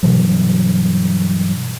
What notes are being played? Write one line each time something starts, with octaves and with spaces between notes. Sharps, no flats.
G2 B2 E3 F#3